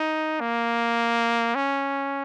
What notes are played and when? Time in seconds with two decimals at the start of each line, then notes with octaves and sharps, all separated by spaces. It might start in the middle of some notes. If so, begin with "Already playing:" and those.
Already playing: D#4
0.40 A#3
1.55 C#4